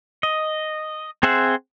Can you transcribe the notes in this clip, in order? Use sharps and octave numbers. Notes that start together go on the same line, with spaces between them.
D#5
C4 G#4 C5 E5 F#5